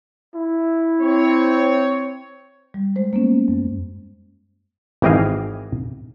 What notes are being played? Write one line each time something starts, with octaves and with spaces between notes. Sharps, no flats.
E4
C4 C#5
G3
G#3 C5
A#3 B3 C#4
F#2
G#1 E3 G4 D#5 F5 G#5